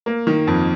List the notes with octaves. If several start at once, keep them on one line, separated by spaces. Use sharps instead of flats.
A#3
D#3
F2